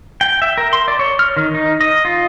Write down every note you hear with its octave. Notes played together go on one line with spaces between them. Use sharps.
G5
E5
A#4
C6
D5
C#5
F6
D#3
D#4
D#5
F4